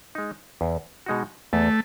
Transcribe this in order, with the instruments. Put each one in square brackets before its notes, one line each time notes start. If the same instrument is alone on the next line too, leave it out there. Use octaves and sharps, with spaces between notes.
[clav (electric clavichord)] G#3 D#4
E2
B2 G#3 D#4 F#4
[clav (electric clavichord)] E2 [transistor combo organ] A3